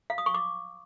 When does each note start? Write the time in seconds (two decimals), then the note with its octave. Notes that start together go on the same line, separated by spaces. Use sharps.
0.10 F5
0.18 D#6
0.26 C#6
0.34 D6